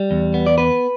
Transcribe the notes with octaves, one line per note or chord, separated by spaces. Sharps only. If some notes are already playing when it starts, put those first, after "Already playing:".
Already playing: G3
E2
B3
D5
B3 B4